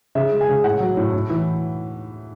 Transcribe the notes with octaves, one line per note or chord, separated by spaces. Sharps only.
C#3 E5
G#3
G#5
C#3
A2 F#5
F#3
A2
A2
E3